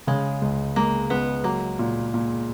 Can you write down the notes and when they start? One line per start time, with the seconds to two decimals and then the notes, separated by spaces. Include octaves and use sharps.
0.07 C#3 G#3
0.42 C#2
0.76 G#3 A#3
1.10 C#2 B3
1.44 F#3 A#3
1.79 A#2
2.14 A#2